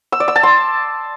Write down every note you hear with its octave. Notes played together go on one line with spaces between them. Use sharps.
E6
D5
E6
A5
C6